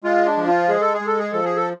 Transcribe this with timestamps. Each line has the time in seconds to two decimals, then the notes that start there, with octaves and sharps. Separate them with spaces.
0.04 G#3 F4
0.26 D4
0.37 F3
0.47 F4
0.69 G#3 G#4
0.81 A4
0.94 G#4
1.01 G#3
1.07 A4
1.19 G#4
1.32 F3 A4
1.44 G#4
1.57 A4